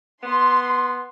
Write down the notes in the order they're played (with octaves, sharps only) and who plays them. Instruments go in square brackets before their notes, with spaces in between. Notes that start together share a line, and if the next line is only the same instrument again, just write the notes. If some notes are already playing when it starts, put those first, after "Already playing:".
[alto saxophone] B3 [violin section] C6